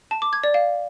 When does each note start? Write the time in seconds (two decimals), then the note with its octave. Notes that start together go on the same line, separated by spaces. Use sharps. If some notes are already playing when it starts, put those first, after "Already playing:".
0.11 A5
0.22 D6
0.33 G#6
0.44 D5
0.54 F5